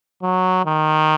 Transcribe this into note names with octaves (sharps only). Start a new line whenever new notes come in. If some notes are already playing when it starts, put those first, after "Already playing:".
F#3
D#3